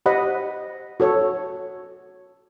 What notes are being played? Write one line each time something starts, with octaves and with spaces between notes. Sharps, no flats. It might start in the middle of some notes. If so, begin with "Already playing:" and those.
G4 C5 D#5 F#5 B5
F#4 A4 C#5